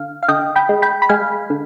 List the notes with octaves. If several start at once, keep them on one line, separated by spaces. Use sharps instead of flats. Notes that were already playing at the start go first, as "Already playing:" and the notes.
Already playing: D3 F5
F5
D3 D#5 G5
G5 B5
G#3
G5 B5
B5
G#3 F5 G#5
D3